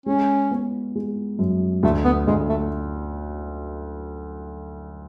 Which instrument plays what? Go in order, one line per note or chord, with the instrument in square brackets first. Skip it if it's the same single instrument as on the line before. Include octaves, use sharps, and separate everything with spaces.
[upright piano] G#3 [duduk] C#4
[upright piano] B3
G#3
F#2
[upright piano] D2 [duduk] A3
[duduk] B3
[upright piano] D2 [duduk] G#3
[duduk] A3